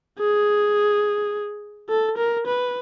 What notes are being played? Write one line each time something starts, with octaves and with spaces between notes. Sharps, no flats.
G#4
A4
A#4
B4